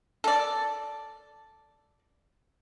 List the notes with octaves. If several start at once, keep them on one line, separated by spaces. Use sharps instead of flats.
A4 D5